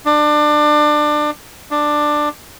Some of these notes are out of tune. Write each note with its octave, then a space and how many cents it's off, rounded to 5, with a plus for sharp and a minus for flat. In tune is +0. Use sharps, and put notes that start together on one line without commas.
D4 +25
D4 +10